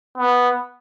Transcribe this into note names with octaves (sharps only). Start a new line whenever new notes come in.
B3